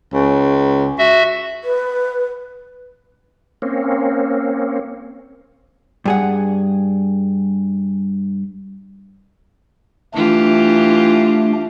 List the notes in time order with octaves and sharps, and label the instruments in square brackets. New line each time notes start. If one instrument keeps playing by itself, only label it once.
[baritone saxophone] C#2
[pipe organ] F#4 E5
[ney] B4
[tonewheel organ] A#3 C4 C#4
[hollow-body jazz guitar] G2 G#4 F#5
[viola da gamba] E3 F4 G4 [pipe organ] A3 D4